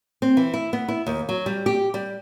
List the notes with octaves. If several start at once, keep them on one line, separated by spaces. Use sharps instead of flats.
C4
E3
E4
B3
E4
D#2
F#3
G3
G4
G3